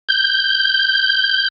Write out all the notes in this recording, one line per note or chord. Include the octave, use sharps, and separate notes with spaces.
G6